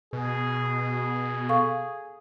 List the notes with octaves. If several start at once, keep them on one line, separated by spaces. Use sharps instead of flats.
B2 G#4
A4 F5 C#6